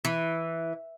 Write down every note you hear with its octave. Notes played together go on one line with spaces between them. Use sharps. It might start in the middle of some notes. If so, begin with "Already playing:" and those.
E3